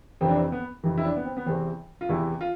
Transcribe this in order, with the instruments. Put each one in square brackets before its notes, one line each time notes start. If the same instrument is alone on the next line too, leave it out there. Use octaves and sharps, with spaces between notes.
[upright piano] F2 C3 E3 C4
D4
C4
B3
F2 C3 E3
E4
D4
B3
C4
B3
E2 C3 E3 C4
F4
E2 C3 E3 E4
F4